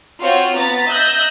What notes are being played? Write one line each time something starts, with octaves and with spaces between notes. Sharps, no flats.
C4 F4 F#4 C5 C#5
B3 A#5 A6 B6
D#5 E5 E6 F#6 G6 A#6